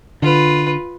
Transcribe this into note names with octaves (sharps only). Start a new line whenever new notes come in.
D3 F4 B4